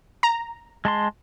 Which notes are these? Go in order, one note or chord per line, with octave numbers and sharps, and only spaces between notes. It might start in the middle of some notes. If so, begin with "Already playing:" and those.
A#5
G#3 A5 C6